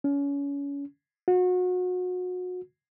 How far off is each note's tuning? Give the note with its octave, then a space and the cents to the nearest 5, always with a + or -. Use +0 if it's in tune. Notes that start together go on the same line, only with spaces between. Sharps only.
C#4 +30
F#4 -30